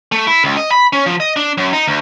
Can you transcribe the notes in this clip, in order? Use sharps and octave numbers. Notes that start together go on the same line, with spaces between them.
A3
E4
C#2
D#5
B5
C#4
F3
D#5
D4
F#2
D#4
D2